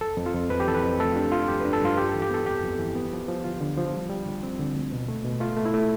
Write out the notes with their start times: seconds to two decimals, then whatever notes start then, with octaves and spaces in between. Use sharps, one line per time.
0.01 F2 A4
0.17 F2
0.26 F4
0.35 F2
0.50 F2 B4
0.60 G4
0.67 E3 A4
0.74 B4
0.83 F2
0.99 A3 A4
1.12 F4
1.16 D4 G4
1.32 F3 F4
1.48 G2 G4
1.60 D4 B4
1.73 A4
1.81 G2 F4
1.97 G3 G4
2.09 A4
2.15 E3
2.22 G4
2.30 B3 A4
2.46 F2 G4
2.63 F2
2.79 E3
2.95 B3
3.13 F3
3.28 F3
3.44 D2 F4
3.60 D3
3.77 F3
3.94 G3
4.09 G3
4.26 D2
4.43 C4
4.59 D3
4.75 D2
4.92 B2
5.08 A3
5.25 B2
5.40 A3 F4
5.57 A3
5.65 E4
5.74 A3